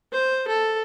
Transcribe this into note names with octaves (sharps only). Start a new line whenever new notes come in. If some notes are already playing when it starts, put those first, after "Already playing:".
C5
A4